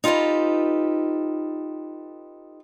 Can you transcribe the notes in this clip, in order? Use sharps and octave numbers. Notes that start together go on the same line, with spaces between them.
D#4 F4 G4 A4 B4